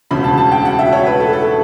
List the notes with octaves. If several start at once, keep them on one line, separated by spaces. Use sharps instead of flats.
E1 D2 C#3 B5
A5
A5
G5
F#5
E5
C#5
B4
A4
A4